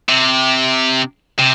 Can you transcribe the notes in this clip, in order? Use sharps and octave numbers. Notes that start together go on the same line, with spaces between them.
C3
C3